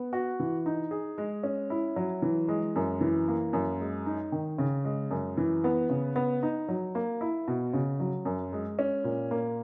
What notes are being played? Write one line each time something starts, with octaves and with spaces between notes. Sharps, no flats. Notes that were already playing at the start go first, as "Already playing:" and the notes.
Already playing: B3
F#4
E3
D#4
G#4
G#3
C#4
E4
F#3
E3
G#3
F#2
E3
A#3
F#2
G#3
D#4
D#3
C#3
G#3
F#2
E3
B3
C#3
B3
D#4
F#3
A#3
E4
B2
C#3
F#3
F#2
G#3
C#4
A#2
A#3